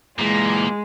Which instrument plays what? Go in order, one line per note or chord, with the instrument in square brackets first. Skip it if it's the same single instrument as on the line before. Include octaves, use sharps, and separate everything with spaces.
[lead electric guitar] A#2 E3 [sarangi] G#3 [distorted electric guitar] A#3